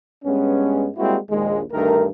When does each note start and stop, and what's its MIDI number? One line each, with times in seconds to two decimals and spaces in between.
0.25 0.89 43
0.25 0.89 56
0.25 0.89 59
0.25 0.89 61
0.97 1.18 55
0.97 1.18 56
0.97 1.18 58
0.97 1.18 60
0.97 1.18 64
0.97 1.18 66
1.31 1.62 34
1.31 1.62 39
1.31 1.62 56
1.73 2.07 38
1.73 2.07 43
1.73 2.07 51
1.73 2.07 57
1.73 2.07 70